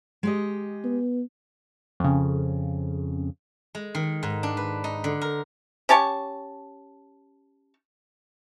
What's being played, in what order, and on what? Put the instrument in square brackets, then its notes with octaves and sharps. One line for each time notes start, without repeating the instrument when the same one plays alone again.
[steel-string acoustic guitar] G#3 G4 D#5
[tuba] B3
[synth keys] F2 C#3
[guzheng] G#3
D#3
G#2
D4
B4
D#4
D3
A#4
[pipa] C#4 G4 A5 C#6